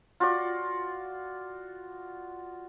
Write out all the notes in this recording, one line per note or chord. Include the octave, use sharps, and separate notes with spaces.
F4 F#4 D5